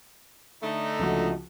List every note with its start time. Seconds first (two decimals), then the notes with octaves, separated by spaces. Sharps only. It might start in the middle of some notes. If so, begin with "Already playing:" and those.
0.63 D3 A3 D#4
0.99 C#2 F3 F#4